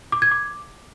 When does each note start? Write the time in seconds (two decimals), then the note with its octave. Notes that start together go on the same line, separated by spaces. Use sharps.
0.12 D6
0.22 G#6
0.31 D6